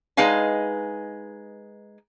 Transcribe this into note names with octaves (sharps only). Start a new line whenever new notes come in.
G#3 D#4 B4 D#5 F5 G#5